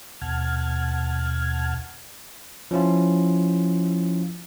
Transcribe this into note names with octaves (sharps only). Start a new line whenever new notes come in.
D#2 B2 F#5 A5 F6 G#6
F3 C#4 E4 F4